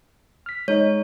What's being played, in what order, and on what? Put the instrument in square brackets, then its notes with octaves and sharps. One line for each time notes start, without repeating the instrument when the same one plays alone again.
[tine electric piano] F6 B6
[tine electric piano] G#3 D#4 D#5 [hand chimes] C#5